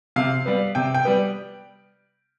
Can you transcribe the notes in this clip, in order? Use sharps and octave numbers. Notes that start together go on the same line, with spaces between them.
C3 F5
G3 B3
C3 G5
G5
G3 B3